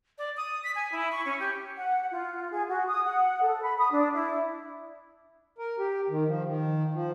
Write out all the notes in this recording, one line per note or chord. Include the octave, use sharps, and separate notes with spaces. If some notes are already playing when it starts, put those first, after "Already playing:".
D5
D#6
B6
G#5
E4
C#6
C#4
G4
F#5
F4
G#4
F#4
D#6
F#5
A4
B5
D#6
D4
E4
A#4
G4
D#3
F3
D#3
F3